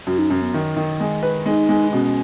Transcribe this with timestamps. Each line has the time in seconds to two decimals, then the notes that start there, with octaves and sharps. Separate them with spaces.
0.07 F#2 F#4
0.19 D#4
0.31 F#2 C#4
0.42 B3
0.54 D#3
0.76 D#3
1.00 G#3
1.23 B4
1.46 G#3 D#4
1.69 G#3
1.92 B2 C#4